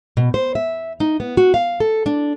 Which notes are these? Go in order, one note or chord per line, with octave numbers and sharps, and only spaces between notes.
B2
C5
E5
D#4
B3
F#4
F5
A4
D4